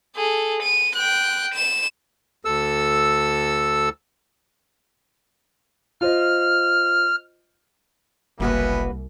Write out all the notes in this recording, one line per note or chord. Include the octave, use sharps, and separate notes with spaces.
G#4 A4
D#7
G5 F#6
E7
D2 A4 E6
F4 C5 D#5 F6
F#1 C2 A#3 B3 C#4 E4 F#4 B4